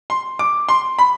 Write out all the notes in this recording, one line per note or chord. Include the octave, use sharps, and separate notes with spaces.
C6
D6
C6
B5